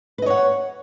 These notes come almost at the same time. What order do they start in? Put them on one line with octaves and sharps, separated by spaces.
B4 D#5 C#5 F#5